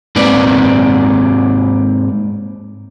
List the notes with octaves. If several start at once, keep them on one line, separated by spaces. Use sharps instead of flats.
G#2 A#3 C4 B4 D5